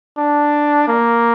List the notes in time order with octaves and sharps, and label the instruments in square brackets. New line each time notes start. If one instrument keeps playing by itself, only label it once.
[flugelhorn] D4
A#3